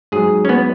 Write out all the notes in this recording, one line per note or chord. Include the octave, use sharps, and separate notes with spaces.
G#2 F#3 G#4
C#4
B3